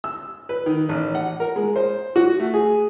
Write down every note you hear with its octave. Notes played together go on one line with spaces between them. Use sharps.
E6
B4
D#3
A1
F#5
A#4
G#3
C5
F#4
A3
G#4